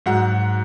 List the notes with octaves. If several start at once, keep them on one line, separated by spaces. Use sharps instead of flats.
G#2 F#3 F#5